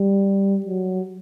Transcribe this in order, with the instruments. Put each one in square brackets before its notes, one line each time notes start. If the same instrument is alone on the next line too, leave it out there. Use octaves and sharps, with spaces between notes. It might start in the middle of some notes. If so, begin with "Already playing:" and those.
Already playing: [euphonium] G3
F#3